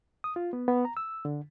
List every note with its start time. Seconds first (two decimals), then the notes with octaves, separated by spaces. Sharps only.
0.24 D#6
0.36 F4
0.53 B3
0.68 B3
0.85 A#5
0.97 E6
1.25 D3